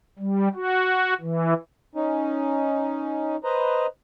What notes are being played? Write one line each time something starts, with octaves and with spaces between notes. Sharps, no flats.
G3
F#4
E3
C#4 D#4
B4 C5 D#5 A#5